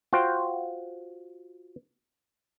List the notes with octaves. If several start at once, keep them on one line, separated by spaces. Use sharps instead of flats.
F4 F#4 C5 G5